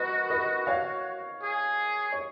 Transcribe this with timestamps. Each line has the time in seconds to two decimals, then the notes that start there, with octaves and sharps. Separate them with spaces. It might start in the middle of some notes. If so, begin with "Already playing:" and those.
Already playing: F#4 A#4 B4 D#5
0.30 B4 D#5
0.67 C#5 F5
1.42 G#4
2.12 C#5